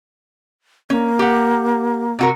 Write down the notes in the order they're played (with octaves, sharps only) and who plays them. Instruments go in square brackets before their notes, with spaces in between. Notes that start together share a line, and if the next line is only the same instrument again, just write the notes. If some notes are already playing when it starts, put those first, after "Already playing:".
[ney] A#3 [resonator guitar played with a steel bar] C#4
[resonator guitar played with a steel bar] G4 F#5
C3 F#4 A#4